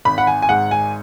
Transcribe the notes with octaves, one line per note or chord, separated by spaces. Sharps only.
G#1 B5
F#5
G#5
G#5
G#2 F#5
G#5